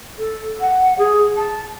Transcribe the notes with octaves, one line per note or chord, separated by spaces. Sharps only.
A4
F#5
G#4
A5